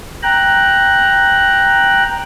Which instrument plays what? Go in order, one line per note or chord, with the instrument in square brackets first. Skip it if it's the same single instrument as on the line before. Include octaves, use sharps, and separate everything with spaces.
[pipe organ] G5 A#5 F#6